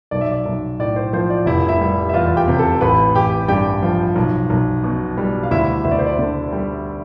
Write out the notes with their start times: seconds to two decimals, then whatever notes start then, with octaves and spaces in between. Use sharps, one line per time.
0.11 B1 D5
0.21 E5
0.32 D5
0.46 B1
0.79 A2 D5
0.96 C5
1.13 F3 C5
1.30 D5
1.46 F1 E4 E5
1.69 E4 E5
1.81 G3
2.09 E5
2.14 E2 F4 F5
2.36 G4 G5
2.48 C3
2.58 A4 A5
2.81 A1 B4 B5
3.15 A1 G4 G5
3.48 G2 G4 G5
3.83 F3
4.16 B1
4.50 B1
4.84 B2
5.17 G3
5.43 F5
5.51 D2 E4 E5
5.84 D2 E5
5.91 D5
5.99 C5
6.06 D5
6.19 D3
6.53 G3